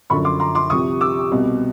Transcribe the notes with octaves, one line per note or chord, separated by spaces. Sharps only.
F#2 D3 F3 B5 C#6
C6 D6
A#5 C6
C6 D6
C2 C3 F3 C#6 D#6
D6 E6
C2 B2 G3